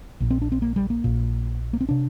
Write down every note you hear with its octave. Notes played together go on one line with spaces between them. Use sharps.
A#1 A#2
C4
D4
C4
A#3
G3
A#3
A#1 A#2
A#3
C4
C3 D4